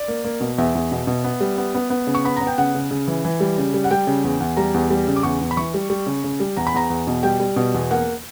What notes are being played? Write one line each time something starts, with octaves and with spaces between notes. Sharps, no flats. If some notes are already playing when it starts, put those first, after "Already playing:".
Already playing: D5
A#3
A#3
B2
E2 E5
E2
B2
B2
B3
G3
B3
B3
B3
C#3
C#6
B3 B5
B3 A#5
G5
C#3 F#5
C#3
C#3
E3
E3
G3
C#3
G3
F#5
G3 G5
C#3
E2
E2
G3 A#5
E2
G3
C#3
D6
E2 C#6
E2
B5
E3 C#6
G3
G3
C#3
C#3
G3
E2 A#5
B5
E2 A#5
E2
B2
G3 G5
G3
B2
E2
A#3 F#5